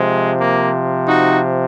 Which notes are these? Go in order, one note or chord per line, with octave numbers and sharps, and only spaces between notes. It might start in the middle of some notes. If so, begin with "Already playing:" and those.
Already playing: C3 F3 G#3
A#3
D#4 F#4